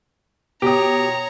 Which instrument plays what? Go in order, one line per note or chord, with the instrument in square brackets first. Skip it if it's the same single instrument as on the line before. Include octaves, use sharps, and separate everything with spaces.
[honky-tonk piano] B2 G5 D#6 [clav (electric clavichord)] G4 [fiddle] C#5 A#5